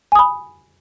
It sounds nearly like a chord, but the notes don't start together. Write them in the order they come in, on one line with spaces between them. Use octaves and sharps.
G#5 D#6 B5